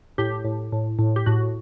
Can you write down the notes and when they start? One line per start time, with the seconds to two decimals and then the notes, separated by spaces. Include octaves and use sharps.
0.18 A2 G4
0.45 A2
0.72 A2
0.99 A2
1.16 G4
1.26 A2 F#4